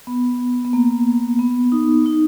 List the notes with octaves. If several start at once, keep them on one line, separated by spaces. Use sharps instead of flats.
B3
B3
A#3
B3
D#4
D#4